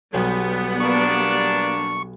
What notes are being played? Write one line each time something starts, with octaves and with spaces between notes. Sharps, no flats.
B1 G3 B3
A#3 D4 C#6